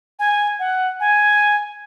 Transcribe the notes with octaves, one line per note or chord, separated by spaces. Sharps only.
G#5
F#5
G#5